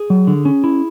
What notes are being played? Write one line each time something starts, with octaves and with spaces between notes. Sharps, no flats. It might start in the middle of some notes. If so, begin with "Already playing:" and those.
Already playing: G#4
F#3
D3
C#4
E4